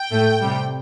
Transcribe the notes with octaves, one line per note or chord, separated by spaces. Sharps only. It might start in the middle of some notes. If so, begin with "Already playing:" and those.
Already playing: G5
A2 A3
C3 G3